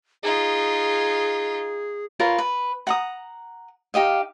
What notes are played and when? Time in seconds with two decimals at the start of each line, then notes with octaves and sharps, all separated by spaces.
0.23 D#4 F4 G#4
2.20 F4 A#4 B4 C#5
2.38 B4
2.87 F#5 A#5 D#6
3.94 D#4 G4 D#5 F5